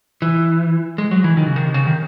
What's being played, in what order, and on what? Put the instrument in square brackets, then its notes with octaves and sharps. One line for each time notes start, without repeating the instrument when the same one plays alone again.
[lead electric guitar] E3
G#3
F#3
E3
D#3
C#3
D#3
C3
C#3
D#3